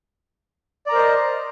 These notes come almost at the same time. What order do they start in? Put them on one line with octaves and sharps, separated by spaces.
D5 A#5 A#4 C5 D#5